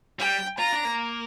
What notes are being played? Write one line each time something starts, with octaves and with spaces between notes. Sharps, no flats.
G3 G5
F4 A#5
D4
A#3